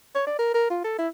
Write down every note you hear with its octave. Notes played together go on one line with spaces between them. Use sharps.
C#5
D5
A#4
A#4
F4
A4
E4